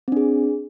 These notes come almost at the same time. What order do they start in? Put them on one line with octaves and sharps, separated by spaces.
C4 D4 G#4